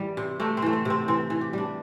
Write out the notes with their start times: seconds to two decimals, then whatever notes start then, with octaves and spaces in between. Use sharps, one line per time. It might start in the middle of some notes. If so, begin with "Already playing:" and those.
Already playing: E3 G3
0.17 C3
0.40 C3 A3
0.57 C4
0.62 E3 A3
0.73 C4
0.85 C3 C4
1.08 E3 C4
1.30 E3
1.41 G4
1.53 G3 D4